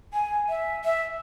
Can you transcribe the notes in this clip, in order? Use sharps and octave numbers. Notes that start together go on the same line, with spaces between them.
G#5
E5
E5